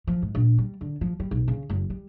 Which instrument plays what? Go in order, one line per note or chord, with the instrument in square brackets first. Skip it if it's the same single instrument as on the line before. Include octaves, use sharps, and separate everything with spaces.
[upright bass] F3
G#2
A#1
G3
D3
F3
G3
B1
C#3
F#1
G3